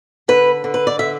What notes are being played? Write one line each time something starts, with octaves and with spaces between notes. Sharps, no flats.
D3 B4
D3
B4
D5
D3 E5